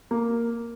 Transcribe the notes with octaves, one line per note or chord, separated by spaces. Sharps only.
A#3